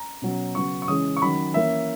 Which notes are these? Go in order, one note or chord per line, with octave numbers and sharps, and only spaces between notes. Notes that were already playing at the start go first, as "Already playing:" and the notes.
Already playing: A#5
B2 F#3 C#4
C#3 F#3 B3 C#6
C#6
C#3 E3 G#3 C#4 D#6
C#6
D#3 F#3 C#4 B5
E3 A#3 C#4 E5